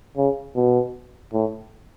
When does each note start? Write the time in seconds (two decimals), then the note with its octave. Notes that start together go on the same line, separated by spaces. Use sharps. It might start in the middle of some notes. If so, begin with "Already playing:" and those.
0.17 C#3
0.56 B2
1.33 A2